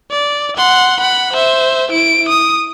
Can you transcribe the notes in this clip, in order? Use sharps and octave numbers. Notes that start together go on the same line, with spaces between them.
D5
F#5 C6
F#5 B5
C5 E5
E4 D7
D#6